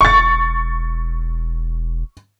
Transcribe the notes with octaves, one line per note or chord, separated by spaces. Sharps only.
E1 C#6 A6